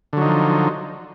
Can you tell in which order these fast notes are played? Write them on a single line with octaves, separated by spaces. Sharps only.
D3 F#3 D#4 F3